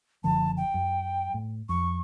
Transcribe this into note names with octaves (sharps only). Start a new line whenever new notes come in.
F#1 D3 F3 A5
G5
F#2
A2
F2 C#6